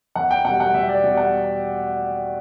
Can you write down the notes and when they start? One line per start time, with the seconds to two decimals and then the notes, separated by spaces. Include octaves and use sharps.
0.15 E2 F#5
0.31 G5
0.45 B2 G3 F#5
0.60 F#5
0.74 E2 E5
0.89 D5
1.03 B2 G3
1.17 F#5